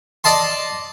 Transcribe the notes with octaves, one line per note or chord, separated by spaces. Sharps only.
D5 D#5 A5 C6